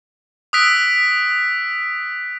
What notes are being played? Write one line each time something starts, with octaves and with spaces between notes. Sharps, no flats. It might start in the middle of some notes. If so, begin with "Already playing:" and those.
D#6 E6 F#6 B6 D7